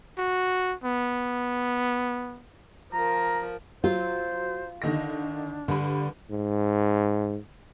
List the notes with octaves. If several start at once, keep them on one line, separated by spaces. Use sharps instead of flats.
F#4
B3
F3 A#4 A#5
F#3 F4 C5
D3 D#3 D4 A#6
G2 D3 B5
G#2